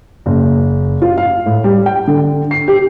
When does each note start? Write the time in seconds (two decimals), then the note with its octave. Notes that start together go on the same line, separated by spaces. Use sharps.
0.26 F#1
1.02 F4
1.18 F5
1.46 A2
1.64 G3
1.86 G5
2.07 D3
2.51 C7
2.68 G4